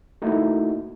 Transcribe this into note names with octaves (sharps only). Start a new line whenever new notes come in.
A3 A#3 D#4 E4 F#4